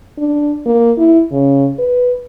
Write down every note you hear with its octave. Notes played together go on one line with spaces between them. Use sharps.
D4
A#3
E4
C#3
B4